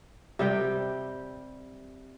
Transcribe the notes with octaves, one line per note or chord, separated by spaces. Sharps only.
C3 G3 G5